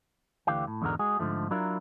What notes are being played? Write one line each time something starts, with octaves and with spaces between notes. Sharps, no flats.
D2 D3 E3 G4 F5 G5
A2
E2 G#2 D3 G#3 F#4 A#4
G#3 F#4 G#4
G#2 D3 F3 A3
F#3 D4 E4 F4 A#4